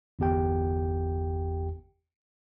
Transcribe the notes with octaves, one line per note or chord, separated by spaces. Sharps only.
G1 E2 G4 G5